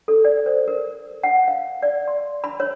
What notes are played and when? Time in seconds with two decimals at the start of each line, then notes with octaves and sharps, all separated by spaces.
0.08 A4
0.25 D5
0.46 C5
0.68 A#4
1.23 F#5
1.48 F5
1.82 D5
2.08 C6
2.44 B5
2.60 C#5